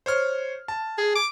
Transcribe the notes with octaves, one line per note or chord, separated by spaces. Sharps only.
C5 C#5 F6
A5
G#4
D6